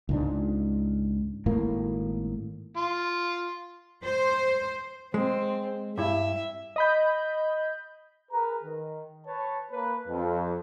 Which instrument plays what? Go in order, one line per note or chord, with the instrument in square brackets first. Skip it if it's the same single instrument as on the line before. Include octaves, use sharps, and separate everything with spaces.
[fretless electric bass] C#2 G#2 D4
G#1 A2 A#3
[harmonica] F4
[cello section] C5
[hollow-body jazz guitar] G#3 [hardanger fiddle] C4
[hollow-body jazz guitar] G2 E4 [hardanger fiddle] E5
[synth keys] D#5 B5 G6
[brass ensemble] G#4 A#4 B4 A#5
D#3
B4 C#5 A5
A#3 B4
F2